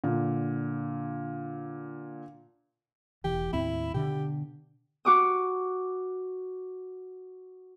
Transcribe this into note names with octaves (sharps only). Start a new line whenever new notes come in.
A#2 D3
E1 E3 G4
D#2 A2 C4 E4
B2 D3 G4
F#4 D6 D#6